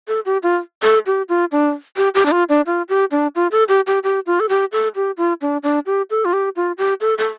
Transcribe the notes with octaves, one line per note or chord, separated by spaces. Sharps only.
A4
G4
F4
A4
G4
F4
D4
G4
G4
D4
F4
D4
F4
G4
D4
F4
A4
G4
G4
G4
F4
A4
G4
A4
G4
F4
D4
D4
G4
A4
F4
G4
F4
G4
A4
A4